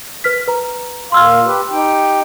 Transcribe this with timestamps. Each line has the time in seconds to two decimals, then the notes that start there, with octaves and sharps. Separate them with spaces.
0.24 B4 F6 B6
0.48 B4 A#5
1.12 A#2 F5 C6 E6 F6
1.45 G4 B4
1.72 D#4 G4 G5